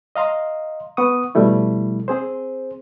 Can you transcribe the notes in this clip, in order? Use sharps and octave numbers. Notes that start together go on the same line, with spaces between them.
D#5 F5 A#5 C6
B3 F#5 C#6 D#6
B2 F3 G3 A3 E4
C4 G#4 C5